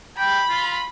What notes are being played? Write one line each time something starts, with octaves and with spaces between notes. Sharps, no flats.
G5 B5
F4